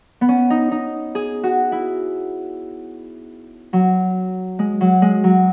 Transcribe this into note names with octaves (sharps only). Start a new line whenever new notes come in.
B3
C#4
D#4
D#4
G#4
F#4
E4
F#3
G#3
F#3
G#3
F#3